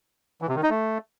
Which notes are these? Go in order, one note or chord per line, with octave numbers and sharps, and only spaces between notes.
E3
C3
D#3
D#4
A3